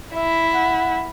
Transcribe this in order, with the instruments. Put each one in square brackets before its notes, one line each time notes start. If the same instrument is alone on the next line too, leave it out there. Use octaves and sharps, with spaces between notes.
[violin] E4 [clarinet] E5
[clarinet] F#5